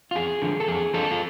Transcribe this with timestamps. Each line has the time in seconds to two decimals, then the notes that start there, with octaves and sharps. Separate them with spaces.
0.11 F4
0.15 F2 G#4
0.42 D3 F3
0.60 A4
0.68 F2 G#4
0.94 D3 F3 A4
1.11 F4